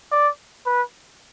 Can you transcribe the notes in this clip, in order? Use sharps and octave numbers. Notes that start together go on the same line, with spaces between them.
D5
B4